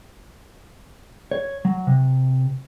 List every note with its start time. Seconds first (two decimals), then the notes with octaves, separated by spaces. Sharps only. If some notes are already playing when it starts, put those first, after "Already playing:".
1.31 C#5
1.65 F#3
1.87 C3